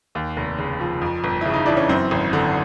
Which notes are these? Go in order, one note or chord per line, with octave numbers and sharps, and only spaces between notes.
D#2
F1
C#3
F3
F2
G1
C#3 E4
D#4
E3 D4
C#4
F#2 C4
G#1
D3